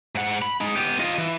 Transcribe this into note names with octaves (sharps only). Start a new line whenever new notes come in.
G#2 F#5
B5
G#3 D#4
B3 G4
F4 D#5
E3